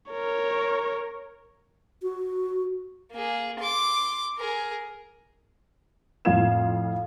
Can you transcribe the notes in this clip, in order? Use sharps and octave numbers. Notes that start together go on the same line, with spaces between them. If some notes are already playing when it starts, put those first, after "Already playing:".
A#4 C#5
F#4
A#3 G#4
C6 D6
G#4 A#4
F2 A2 F4 F5 G#6 E7